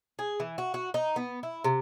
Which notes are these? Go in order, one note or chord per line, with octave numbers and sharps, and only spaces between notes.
G#4
E3
F#4
F#4
D#4
B3
E4
C3